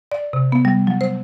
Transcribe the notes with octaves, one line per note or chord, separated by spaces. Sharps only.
D5
C3
B3
G3
F#3
C5